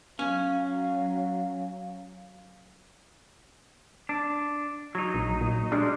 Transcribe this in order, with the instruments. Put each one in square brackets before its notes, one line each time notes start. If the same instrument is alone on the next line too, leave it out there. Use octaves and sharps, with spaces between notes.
[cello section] F#3 [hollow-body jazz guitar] C#4 [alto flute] F5
[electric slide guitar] D4
F#3 D#4
[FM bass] A#1
A#2
[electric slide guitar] G3 G#3 [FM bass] D4